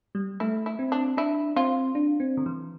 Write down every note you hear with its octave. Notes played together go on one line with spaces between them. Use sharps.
G3
A3 E4
E4
C4
D4
D4 E4
C4 F4
D4
C4
D3
E3